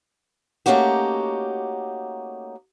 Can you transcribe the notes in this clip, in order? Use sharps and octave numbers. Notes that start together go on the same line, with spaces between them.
A3 A#3 C#4 D#4 F#4 G4